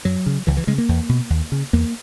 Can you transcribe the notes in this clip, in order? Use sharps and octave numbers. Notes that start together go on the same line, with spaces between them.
F#2 F#3
C#3
C#2 E3
E3
C#3 G#3
A#3
E2
B2
D#2
C#3
E2 A#3